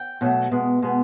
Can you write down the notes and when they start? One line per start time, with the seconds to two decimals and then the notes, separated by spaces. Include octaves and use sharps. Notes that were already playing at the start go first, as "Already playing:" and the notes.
Already playing: G5
0.21 B2 F#3 A3
0.51 B2 G#3 B3
0.82 B2 G#3 B3